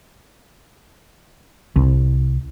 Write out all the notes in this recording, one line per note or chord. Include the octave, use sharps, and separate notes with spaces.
C2